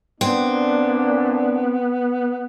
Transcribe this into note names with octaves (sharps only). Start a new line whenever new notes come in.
A#2 B3 C4 D4